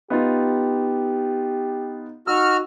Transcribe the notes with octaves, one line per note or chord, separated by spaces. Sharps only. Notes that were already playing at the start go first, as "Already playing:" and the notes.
B3 D#4 F4 G4
D#4 F#4 E6 F6